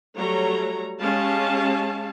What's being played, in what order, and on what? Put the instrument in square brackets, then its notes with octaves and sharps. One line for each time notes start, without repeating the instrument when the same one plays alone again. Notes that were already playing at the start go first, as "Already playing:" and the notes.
[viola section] F#3 G3 A3 C#5 A#5
G#3 C#4 G4 F5 A5